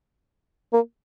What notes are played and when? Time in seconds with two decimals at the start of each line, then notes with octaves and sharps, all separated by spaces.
0.73 A#3